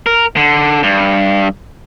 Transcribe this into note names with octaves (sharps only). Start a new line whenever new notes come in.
A#4
D3
G2